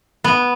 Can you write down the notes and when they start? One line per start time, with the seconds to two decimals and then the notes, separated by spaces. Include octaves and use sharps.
0.24 B3